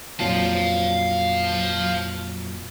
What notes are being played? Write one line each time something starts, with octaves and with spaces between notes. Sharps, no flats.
F2 A#2 F#3 F5 A5